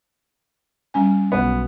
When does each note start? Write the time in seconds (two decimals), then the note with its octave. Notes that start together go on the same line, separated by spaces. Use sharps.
0.94 G3 C#4 G#5
1.32 B1 B3